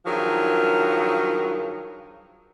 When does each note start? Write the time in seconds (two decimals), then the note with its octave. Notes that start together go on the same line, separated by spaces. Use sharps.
0.06 G2 D#3 F3 F#3 G#4 A#4